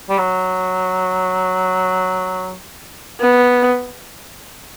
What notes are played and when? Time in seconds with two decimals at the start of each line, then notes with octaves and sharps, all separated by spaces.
0.10 G3
0.18 F#3
3.20 B3